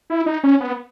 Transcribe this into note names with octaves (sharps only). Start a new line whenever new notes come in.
E4
D#4
C#4
B3